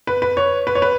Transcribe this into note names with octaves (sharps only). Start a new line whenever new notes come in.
B4
B4
C#5
B4
C#5
B4